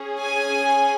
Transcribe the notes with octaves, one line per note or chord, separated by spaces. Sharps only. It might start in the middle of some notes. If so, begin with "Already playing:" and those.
Already playing: C#4 G#4
G#5